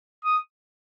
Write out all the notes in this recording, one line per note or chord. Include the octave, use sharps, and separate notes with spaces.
D#6